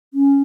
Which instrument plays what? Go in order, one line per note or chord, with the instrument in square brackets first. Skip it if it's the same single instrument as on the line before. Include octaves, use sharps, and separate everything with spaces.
[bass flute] C#4